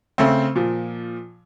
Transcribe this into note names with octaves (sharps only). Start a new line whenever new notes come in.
C#3 A3 C4
A#2 F3